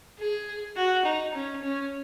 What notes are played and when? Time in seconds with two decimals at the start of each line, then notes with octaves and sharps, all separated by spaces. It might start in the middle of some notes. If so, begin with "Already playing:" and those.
0.19 G#4
0.76 F#4
1.05 D#4
1.34 C#4
1.63 C#4